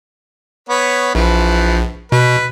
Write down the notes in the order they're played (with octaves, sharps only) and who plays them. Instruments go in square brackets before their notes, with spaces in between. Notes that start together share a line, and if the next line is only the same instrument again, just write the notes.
[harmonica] B3 B4 C#5
[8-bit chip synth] A#1 [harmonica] E3 F3 B4
[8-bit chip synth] B2 [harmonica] B4